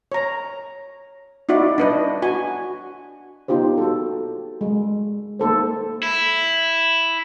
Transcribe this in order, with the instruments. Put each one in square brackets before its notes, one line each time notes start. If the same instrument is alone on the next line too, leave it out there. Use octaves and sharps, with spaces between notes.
[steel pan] C#5 A#5
D#4 E4 F#4 D5
D4 B4 D#5
F#4 G#5
B3 D#4 F4 G4 C5
F#4 A4
G#3
A#3 D#4 A4 C5
[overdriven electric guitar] E4